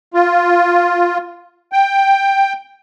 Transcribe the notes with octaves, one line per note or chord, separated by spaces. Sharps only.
F4
G5